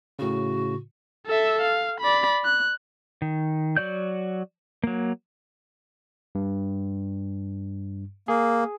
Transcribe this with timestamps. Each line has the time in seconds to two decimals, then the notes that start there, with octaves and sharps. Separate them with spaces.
0.19 A2 C#3 F#4
1.27 A4 E5
1.61 F5
2.01 D5 B5
2.45 F#6
3.22 D#3
3.77 F#3 F#4 D5 G6
4.84 F#3 A#3
6.35 G2
8.28 A#3 G#4